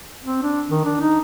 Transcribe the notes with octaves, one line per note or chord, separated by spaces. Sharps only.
C4
D4
D#3
D4
D#4